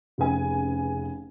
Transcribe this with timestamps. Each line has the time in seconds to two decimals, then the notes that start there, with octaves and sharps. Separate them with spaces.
0.18 F1 C#3 B4 G#5